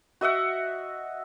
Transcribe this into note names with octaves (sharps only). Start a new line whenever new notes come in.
F#4 D#5 E5 F#5